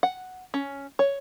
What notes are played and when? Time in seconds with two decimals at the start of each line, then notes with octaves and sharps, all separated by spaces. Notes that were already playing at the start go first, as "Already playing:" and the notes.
0.03 F#5
0.54 C#4
0.99 C#5